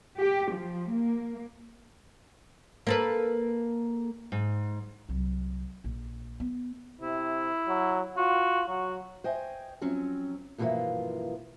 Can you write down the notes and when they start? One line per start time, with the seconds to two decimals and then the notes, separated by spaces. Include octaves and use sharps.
0.19 G4
0.52 F3
0.92 A#3
2.87 A#3 A4 B4
4.32 G#2
5.09 C2 F#3
5.84 A#1
6.40 B3
7.01 C3 E4
7.68 F#3
8.17 F4 F#4
8.68 F#3 F#4
9.24 C5 D#5 G5 G#5
9.81 F3 F#3 C4 C#4
10.58 G2 B2 E3 F3 A#3 F4